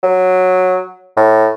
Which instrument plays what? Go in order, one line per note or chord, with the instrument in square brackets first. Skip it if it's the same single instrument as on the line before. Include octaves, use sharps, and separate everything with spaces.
[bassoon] F#3
A2